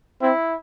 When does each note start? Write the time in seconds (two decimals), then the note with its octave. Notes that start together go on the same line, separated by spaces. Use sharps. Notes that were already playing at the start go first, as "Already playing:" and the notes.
0.22 C4 E4